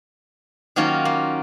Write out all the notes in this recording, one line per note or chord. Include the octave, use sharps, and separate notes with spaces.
D#3 F#3 A#3 C#4 F4
A#3